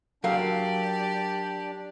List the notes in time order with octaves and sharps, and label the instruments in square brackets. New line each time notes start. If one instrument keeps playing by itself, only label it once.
[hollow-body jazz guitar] F#3 A#4 F5 [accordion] D4 [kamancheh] G4 D5